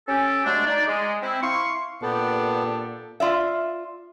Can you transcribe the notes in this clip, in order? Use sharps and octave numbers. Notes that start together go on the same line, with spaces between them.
C#4 G4 A4
F#3 G#3 A3 D4
D#4 D5
G#3
C4 E4
E4 F5 C6 C#6
A#2 B3 D4 G4 A4
F4 D5 E5